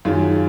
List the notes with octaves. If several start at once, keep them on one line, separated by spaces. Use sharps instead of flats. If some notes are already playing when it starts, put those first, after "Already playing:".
F#2 D#3 F4 G#4